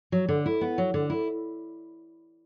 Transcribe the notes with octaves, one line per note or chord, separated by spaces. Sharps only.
F#3
D3
E4
B3
F#3
D3
E4